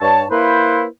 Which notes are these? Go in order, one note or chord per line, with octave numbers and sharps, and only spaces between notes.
G2 C#5 A5
A#3 E4 B4 C5